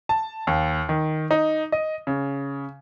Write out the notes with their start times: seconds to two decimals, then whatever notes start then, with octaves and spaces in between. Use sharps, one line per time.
0.09 A5
0.47 D#2
0.89 D#3
1.31 D#4
1.72 D#5
2.07 C#3